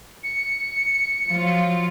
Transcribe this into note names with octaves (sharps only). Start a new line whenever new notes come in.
C#7
F3 F#3 F4